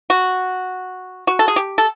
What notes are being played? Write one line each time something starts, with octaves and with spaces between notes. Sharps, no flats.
F#4
F#4
A4
G#4
G4
A4